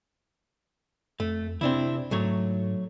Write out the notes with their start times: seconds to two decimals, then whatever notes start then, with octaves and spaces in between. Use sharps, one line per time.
1.20 F2 A3
1.61 C3 C4 D4 E4
2.11 G#2 F#3 A3 C#5